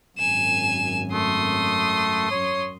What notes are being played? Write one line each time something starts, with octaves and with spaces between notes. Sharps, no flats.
G#1 F#2 G#5 E7
A3 C6 D#6
F#2 C#5